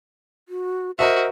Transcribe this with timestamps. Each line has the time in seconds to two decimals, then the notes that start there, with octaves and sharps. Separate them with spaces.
0.49 F#4
0.99 F#4 A#4 C5 D#5 E5